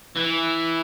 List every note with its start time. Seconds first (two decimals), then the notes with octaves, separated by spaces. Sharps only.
0.17 E3